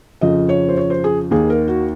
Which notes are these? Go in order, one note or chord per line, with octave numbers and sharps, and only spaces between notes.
F2 C#3 F3 D#5
C#5
C5
C#5
C5
G#4
D#2 D#3 A#3 G#4
A#4
F#4